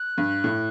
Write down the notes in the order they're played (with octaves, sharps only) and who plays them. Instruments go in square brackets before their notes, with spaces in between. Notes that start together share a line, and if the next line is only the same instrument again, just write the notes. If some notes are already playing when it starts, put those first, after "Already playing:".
Already playing: [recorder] F#6
[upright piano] G2
A2